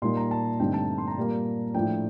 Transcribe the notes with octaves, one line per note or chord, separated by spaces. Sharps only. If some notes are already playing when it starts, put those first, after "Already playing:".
A#2 G3 A#3 D#4 C6
A#5
A5
G2 D3 A3 C4 D#4 G5
A5
C6
A#5
A#2 G3 A#3
A2 F3 A3 D4 G5